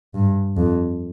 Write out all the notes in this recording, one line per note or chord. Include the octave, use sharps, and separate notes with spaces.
G2
F2